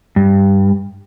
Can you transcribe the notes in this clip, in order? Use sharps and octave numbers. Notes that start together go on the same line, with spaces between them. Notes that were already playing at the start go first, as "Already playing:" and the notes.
G2